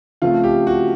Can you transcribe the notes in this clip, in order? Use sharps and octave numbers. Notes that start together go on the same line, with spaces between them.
C#3 F3 A3 C4 F4
G4
F#4